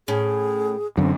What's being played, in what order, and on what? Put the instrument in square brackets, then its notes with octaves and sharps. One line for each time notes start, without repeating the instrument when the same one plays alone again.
[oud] A2 C#4 [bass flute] G#4
[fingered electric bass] F#2 D3 [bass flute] C4